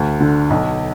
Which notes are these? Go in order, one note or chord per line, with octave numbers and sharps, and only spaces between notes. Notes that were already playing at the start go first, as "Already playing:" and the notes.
Already playing: D2
D3
B1